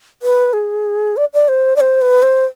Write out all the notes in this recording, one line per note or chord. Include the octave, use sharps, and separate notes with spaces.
B4
G#4
D5
D5
C5
D5
C5
B4
C5